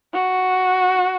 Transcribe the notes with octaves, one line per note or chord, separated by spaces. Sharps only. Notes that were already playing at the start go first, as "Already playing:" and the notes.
F#4